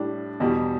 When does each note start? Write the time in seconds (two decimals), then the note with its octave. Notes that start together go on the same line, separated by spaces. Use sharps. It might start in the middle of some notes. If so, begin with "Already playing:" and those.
Already playing: A2 G3 D4
0.40 E2 B2 G3